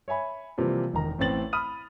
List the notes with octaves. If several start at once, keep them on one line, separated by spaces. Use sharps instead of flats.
C#5 E5 G#5 B5
C3 E3 F3 G3 A#3 F4
E1 D#3 A#5
A1 A2 B3 C4 A6 F#7
B5 D#6 F6 D#7